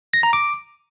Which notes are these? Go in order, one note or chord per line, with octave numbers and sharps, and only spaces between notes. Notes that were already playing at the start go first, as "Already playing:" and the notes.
A#6
A#5
D6